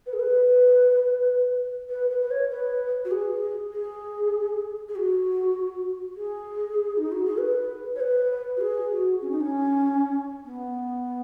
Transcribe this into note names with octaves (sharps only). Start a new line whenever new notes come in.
B4
G#4
B4
B4
B4
B4
C#5
B4
F#4
G#4
G#4
G#4
F#4
G#4
D#4
F#4
G#4
B4
C#5
B4
F#4
G#4
F#4
C#4
D#4
C#4
B3